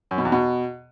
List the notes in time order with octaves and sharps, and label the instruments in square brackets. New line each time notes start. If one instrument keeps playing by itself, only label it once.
[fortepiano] F#2
B2
E2
B2